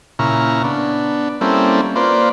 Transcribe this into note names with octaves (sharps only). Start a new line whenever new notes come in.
A#2 C#3 E4 A#5 C#6 F6
B3 D4
G3 A#3 C4 C#4 E4 A4
A#3 F4 B4 C5 D5